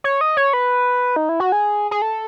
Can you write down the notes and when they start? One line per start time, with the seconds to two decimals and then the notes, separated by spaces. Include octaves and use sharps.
0.04 C#5
0.21 D#5
0.37 C#5
0.53 B4
1.16 D#4
1.29 E4
1.40 F#4
1.52 G#4
1.91 G#4
2.02 A4